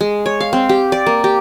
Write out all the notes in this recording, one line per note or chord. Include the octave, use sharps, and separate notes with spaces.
G#3
C#5
F5
C4
G4
D5
A#3
G4